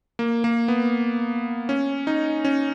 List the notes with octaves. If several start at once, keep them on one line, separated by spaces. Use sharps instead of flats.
A#3
A#3
B3
C#4
D#4
C#4